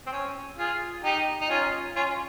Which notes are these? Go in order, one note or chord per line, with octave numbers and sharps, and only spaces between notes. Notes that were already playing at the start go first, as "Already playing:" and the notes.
C4
C#4
F4 G#4
D#4 G4
D#4
C#4 F4
C#4 F4